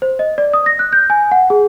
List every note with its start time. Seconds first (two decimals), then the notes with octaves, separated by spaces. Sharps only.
0.02 C5
0.19 D#5
0.38 D5
0.53 D#6
0.66 A#6
0.79 F#6
0.92 G6
1.10 G#5
1.32 F#5
1.50 G#4